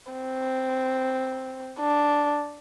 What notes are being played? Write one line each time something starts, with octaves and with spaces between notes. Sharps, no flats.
C4
D4